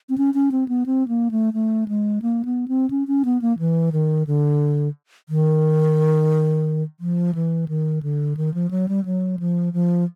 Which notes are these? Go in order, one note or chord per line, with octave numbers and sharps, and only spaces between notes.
C4
C#4
C#4
C4
B3
C4
A#3
A3
A3
G#3
A#3
B3
C4
C#4
C#4
B3
A#3
E3
D#3
D3
D#3
F3
E3
D#3
D3
D#3
F3
F#3
G3
F#3
F3
F3